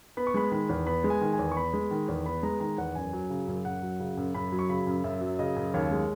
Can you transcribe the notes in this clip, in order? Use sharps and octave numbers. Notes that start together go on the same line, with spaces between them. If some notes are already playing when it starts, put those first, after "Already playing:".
B3 B5
C#6
G#3 B5
D#3 B5
E2
B3 B5
G#3
G#5
D#3
G#5
E2
C#6
B3 B5
G#3
D#3
E2
B3 B5
G#3 A#5
D#3 A#5
E2 F#5
F#2 G#5
F#3
C#3
F#2
F#2 F#5
F#3
C#3
F#2
F#2 B5
F#3
C#6
C#3 B5
F#2
F#2 E5
F#3
C#3 D#5
F#2
D#2 C#5
G#3